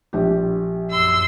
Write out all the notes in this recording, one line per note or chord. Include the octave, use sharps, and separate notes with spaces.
A#1 G4
F#2 C6 E6